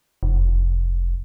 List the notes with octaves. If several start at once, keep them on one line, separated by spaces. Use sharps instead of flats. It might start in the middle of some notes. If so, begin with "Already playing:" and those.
F1